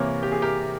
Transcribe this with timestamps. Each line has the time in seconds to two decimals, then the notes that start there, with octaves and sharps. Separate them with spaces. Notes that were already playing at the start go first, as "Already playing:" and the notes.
Already playing: C3 E3 A#3 A#4 C#5
0.23 G4
0.32 G#4
0.42 G4 A#4